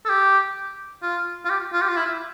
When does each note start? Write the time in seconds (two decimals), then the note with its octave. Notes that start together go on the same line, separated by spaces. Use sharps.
0.05 A4
0.09 G4
1.03 F4
1.45 F4
1.50 G4
1.73 F4
1.82 G4
1.88 F4
1.97 E4